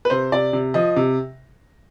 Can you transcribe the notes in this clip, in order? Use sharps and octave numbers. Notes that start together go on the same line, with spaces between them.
B4
C3 C5
C3 D5
C3
F3 D#5
C3